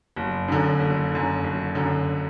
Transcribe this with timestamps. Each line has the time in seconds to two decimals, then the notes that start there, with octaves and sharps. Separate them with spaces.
0.16 F#1
0.48 F#2 D3
0.79 F#1
1.12 F#2 D3
1.44 F#1
1.75 F#2 D3